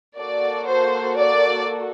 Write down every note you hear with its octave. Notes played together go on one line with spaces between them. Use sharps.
A#3 F#4 A4 D5
C5
D5